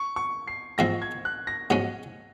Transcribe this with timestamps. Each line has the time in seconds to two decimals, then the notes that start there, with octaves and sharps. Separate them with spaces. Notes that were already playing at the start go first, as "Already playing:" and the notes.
Already playing: C#6
0.16 C#6
0.48 C7
0.78 G#2 F3 C4 A#6
1.02 G#6
1.25 F#6
1.47 A#6
1.70 G#2 F#3 C#4 A#6